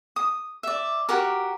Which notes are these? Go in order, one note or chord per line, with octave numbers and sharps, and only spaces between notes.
D#6
D5 E5
F#4 G4 A#4